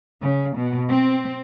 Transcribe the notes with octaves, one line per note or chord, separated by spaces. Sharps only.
C#3
B2
C4